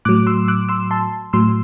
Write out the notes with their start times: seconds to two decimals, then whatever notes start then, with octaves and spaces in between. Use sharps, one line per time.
0.05 A2 F#3 D6 F#6
0.27 C6 E6
0.48 D6 F#6
0.69 C6 E6
0.91 A5 C6
1.33 A2 F#3 C6 E6